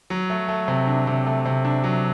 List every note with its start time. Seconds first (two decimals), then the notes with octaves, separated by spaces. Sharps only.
0.10 F#3
0.30 A3
0.48 A3
0.68 C3
0.87 D4
1.07 C3
1.26 A3
1.46 C3
1.65 D4
1.84 F#3